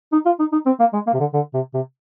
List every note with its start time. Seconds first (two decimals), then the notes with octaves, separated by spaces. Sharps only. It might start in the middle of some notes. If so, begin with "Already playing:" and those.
0.13 D#4
0.26 F4
0.39 D#4
0.52 D#4
0.66 C4
0.80 A#3
0.93 G#3
1.07 A#3
1.14 C3
1.20 D3
1.34 D3
1.54 C3
1.74 C3